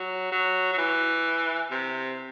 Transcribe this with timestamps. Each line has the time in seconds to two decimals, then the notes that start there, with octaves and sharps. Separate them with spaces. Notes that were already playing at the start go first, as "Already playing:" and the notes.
Already playing: F#3
0.32 F#3
0.73 F#3
0.78 E3
1.71 C3